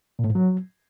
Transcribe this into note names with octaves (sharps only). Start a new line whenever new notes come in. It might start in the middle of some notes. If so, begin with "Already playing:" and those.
A#2
A2
G#2
F#3